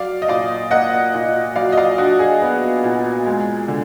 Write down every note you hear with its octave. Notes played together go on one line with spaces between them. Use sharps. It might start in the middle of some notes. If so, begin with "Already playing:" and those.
Already playing: F#3 D5 F5
D#5
A#2 D5 F5
A#3 D#5 F#5
A#2
F#3 D5 F5
D#5
D5 F5
D4 F#4
G#4
B3
A#2
G#3
D3